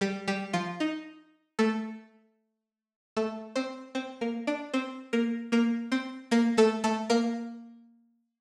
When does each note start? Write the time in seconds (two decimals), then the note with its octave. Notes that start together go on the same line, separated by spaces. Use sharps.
0.01 G3 G4
0.28 G3 G4
0.53 F3 F4
0.80 D#4
1.59 A3 A4
3.17 A3 A4
3.56 C4 C5
3.95 C4 C5
4.21 A#3 A#4
4.47 D4 D5
4.73 C4 C5
5.13 A#3 A#4
5.52 A#3 A#4
5.92 C4 C5
6.31 A#3 A#4
6.57 A3 A4
6.84 A3 A4
7.10 A#3 A#4